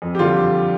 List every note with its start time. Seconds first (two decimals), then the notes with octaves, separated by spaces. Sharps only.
0.02 F2
0.15 G4
0.19 D3 G3 F4